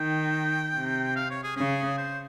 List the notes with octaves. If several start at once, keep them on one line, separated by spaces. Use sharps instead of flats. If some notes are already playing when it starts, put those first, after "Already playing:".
Already playing: D#3 G5
C3
F5
C#5
G#4
C#3 G#4
C5